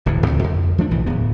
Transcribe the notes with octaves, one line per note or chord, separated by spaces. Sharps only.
E1 D2 A2 E3
C#2 C4
F2
F3 A3 D4
B1 E2 A2 E3
D1 B3